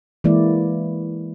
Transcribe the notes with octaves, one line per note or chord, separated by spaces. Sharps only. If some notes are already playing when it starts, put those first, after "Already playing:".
E3 G#3 A#3 E4 D5